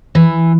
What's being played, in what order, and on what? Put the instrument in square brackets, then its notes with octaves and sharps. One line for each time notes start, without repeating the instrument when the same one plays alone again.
[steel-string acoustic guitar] E3